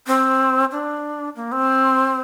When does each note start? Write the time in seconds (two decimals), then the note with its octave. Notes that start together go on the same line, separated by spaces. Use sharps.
0.07 C4
0.72 D4
1.36 A#3
1.52 C4